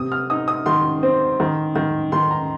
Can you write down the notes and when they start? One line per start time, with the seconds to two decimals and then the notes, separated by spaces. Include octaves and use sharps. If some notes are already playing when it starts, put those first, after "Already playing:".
Already playing: C3 D#6
0.12 F6
0.30 D#4 D#6
0.48 D#6
0.66 D#3 C6
1.03 C4
1.40 D#3
1.76 D#3
2.12 D#3 C6
2.31 A#5